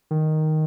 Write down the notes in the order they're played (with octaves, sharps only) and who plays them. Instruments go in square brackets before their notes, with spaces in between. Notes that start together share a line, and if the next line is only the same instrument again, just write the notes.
[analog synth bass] D#3